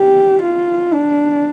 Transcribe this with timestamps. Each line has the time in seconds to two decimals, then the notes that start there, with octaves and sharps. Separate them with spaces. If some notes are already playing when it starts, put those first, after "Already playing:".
Already playing: G4
0.42 F4
0.94 D4